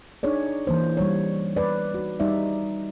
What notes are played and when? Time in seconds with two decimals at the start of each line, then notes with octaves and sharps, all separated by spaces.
0.23 D4 D#4 G#4 C#5 D5
0.67 E3 A#3 C5
0.97 G3 C#5
1.56 B4 D5
1.94 D#4 F#4
2.20 G3 D#4 D5 E5